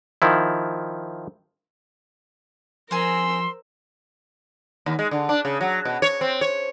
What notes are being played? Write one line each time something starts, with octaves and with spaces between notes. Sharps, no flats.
D#3 F3 E4
F3 C4 G#4 A#4 C5 C6 E6
D#2
G#3
D3
D4
C#3
F#3
B2
C#5
C4
C#5